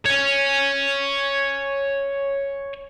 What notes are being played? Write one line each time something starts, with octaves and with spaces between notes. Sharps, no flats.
C#5 G#5